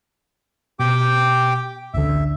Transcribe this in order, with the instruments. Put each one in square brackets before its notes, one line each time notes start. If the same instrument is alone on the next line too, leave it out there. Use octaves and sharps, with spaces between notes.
[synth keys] B2 [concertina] G4 G5 D6
[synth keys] A1 D2 D3 [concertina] E5